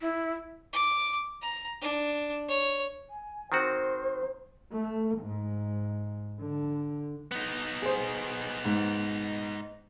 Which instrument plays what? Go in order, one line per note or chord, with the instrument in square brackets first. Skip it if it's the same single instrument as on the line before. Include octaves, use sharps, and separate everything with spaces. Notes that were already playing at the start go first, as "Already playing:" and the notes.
[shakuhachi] E4
[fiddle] D6
A#5
D4
C#5
[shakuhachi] G#5
[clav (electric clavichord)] D#3 C4 F#4 [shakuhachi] C5
[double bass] A3
G#2
D3
[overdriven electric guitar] B3 D#4
[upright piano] G#4 C5
G#2